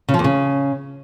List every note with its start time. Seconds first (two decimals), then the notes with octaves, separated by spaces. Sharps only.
0.09 C#3
0.14 F3
0.19 E2
0.24 C#3